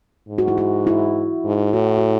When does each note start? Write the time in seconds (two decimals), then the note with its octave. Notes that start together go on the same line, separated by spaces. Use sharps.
0.29 G#2
0.38 F#4
0.48 E4
0.58 F#4
0.87 E4
1.45 G#2
1.73 A2 F#4
1.98 F#4